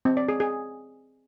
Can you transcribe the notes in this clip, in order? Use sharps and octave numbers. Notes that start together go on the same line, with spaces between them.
C4
D5
G#4
G#4